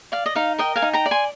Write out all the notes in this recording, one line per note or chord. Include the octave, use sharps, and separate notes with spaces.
D5 F5
D#5
D#4 F5
A#4 D#5 G5
F5 G#5
D#4
G5 A#5
D5
G#5 C6